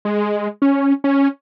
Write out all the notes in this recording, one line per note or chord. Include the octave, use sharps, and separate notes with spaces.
G#3
C#4
C#4